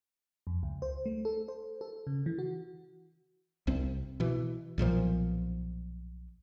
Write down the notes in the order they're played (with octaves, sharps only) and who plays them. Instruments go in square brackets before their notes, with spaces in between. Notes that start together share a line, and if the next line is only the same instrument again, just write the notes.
[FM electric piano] F2
C#2
C5
A3
A4
C5
A4
C#3
E3
F#4
[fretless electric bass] C2 C4
B2 E3
B1 A#2 D3 F3